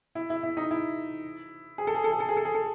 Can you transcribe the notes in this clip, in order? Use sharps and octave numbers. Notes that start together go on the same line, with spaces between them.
E4
E4
E4
D#4
E4
G#4
A4
G#4
A4
G#4
A4
G#4
A4
G#4
A4